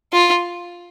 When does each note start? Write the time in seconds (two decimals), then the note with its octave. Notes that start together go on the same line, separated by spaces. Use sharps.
0.13 F4